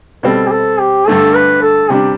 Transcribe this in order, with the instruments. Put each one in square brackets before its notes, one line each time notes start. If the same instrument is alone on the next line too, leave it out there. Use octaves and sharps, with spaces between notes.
[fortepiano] B2 G3 C4 [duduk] A4
[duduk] G4
A4
G4
[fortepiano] G2 D3 A3 [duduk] A4
[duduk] B4
A4
[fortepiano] C3 G3 D4 [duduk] G4